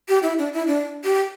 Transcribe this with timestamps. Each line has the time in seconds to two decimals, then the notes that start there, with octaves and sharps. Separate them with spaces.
0.09 G4
0.23 E4
0.39 D4
0.53 E4
0.67 D4
1.05 G4